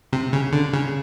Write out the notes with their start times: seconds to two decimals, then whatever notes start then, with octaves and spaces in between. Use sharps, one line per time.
0.13 C3
0.33 C#3
0.53 D3
0.73 C#3